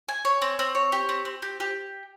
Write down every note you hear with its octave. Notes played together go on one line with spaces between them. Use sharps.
G#5
C#5
C4
C4
C#5
G4
C4
C4
G4
G4